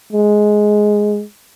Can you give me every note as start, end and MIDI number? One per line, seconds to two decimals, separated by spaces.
0.13 1.22 56